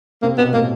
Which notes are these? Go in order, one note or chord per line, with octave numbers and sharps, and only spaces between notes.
C3 A#3
B2 B3
A2 A#3